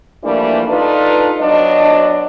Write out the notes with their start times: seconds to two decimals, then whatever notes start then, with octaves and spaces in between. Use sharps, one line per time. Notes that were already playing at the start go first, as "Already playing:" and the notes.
0.24 E3 F3 G3 A3 A#3 D4
0.69 D4 D#4 F4 A4 B4
1.39 B2 F#3 D4 D#5